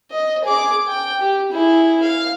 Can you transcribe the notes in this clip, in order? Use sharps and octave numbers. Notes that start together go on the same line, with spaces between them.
D#5
G#4 D6
G5
G4
E4 G#4
F5